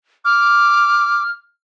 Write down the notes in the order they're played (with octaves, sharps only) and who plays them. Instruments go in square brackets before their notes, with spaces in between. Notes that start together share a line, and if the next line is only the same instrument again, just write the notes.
[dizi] D6 [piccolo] F6